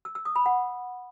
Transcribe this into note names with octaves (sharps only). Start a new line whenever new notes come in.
E6
E6
D#6
B5
F#5